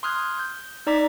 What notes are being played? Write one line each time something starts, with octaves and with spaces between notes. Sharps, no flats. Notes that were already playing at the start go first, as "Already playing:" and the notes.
C6 D#6 F6 F#6 G#6
G6
D#4 D5 A#5 D6 B6